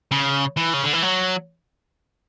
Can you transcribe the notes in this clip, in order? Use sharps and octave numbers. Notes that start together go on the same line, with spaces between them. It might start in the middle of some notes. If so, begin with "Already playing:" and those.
C#3
E3
C#3
D3
E3
F#3